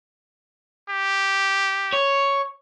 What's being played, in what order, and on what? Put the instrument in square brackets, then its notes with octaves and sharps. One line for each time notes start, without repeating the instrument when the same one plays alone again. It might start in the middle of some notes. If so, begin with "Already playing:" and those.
[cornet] G4
[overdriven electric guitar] C#5